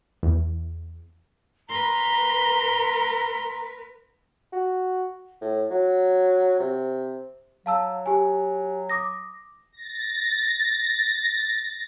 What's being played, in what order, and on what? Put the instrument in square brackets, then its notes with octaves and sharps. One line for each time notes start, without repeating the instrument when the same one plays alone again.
[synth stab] E2
[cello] A#4 B4 [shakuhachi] A#5 [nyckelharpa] C6
[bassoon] F#4
A2
F#3
C3
[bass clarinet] F#3 [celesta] F5 A5 E6
[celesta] G4 G#5
D6 D#6 A#6
[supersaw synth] A6 A#6